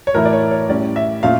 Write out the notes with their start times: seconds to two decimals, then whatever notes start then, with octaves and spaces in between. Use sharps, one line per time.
0.07 C#5
0.14 A2 E3 A3 E4 A#4
0.25 D5
0.33 C#5
0.51 C#5
0.69 A2 G3 C#4 D5
0.96 E5
1.23 A#2 A3 C#4 F4 F5